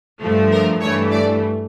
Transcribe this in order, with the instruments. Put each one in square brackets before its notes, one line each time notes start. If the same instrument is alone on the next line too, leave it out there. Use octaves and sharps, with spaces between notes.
[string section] G2 F3 A3
A#4
G2 E3 A3 C#5
D5